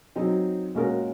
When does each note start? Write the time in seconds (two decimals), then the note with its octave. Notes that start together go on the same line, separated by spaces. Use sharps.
0.16 F#3 C4 D#4
0.75 A#2 G#3 C#4 F#4 A#4